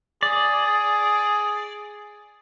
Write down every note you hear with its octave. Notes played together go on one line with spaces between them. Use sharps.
G#4 D5